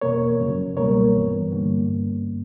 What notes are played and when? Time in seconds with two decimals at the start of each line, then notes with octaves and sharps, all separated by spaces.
0.01 E2 B2 A#3 A#4 C#5
0.40 F#2 C#3 F#3
0.77 C#2 B2 G3 A#3 A#4 C#5
1.15 G2 E3 B3
1.52 G2 D3 A#3